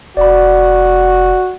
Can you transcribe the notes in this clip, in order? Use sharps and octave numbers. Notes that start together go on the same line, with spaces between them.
F1 F#4 D5 B5